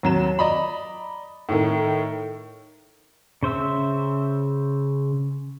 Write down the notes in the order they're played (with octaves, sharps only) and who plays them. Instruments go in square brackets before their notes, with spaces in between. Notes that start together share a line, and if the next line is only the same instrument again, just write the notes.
[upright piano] D#2 F#3 E7
D5 D#5 A#5 B5
A2 D#3
[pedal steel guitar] C#3 C5 E5 E6